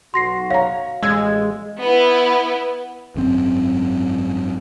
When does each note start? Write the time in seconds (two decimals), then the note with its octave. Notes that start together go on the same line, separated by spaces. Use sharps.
0.14 B1 F#4 C6 A#6 C7
0.51 C#5 F5 A#5
1.03 A1 G#3 E6 G#6
1.80 B3 E4
3.16 G#1 F#2 C4